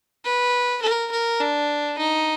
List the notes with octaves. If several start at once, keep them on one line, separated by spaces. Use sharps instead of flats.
B4
A#4
A#4
D4
D#4